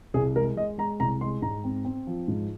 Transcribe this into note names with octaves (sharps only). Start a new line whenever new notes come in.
C2 G#4
G#3 A#4
G#3 D#5
G#3 A#5
C2 A#5
G#3 C6
G#2 A#5
C4
C4
F3
G#2